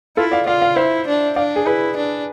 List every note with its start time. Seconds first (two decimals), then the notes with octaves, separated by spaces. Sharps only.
0.17 E4 F4 A4
0.31 D5 F5
0.46 F4 D5 F5
0.62 D5 F5
0.76 E4 C5 E5
1.07 D4
1.36 D4 D5 F5
1.56 G#4
1.66 E4 G#4 B4
1.97 D4